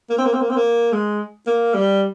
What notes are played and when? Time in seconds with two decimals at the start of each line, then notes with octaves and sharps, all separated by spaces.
0.09 A#3
0.18 C4
0.25 A#3
0.33 C4
0.41 A#3
0.49 C4
0.56 A#3
0.92 G#3
1.47 A#3
1.74 G3